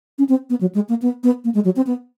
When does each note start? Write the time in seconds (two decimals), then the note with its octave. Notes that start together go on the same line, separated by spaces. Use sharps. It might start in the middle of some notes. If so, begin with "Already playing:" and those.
0.19 C#4
0.29 C4
0.50 B3
0.61 F#3
0.75 G#3
0.89 A#3
1.02 B3
1.23 B3
1.44 A#3
1.55 G#3
1.65 F#3
1.76 C4
1.87 B3